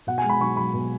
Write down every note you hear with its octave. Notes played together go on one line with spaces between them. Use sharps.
B2 F#5
G#5
G#3
B5
B1 C#6
B1 B5
B2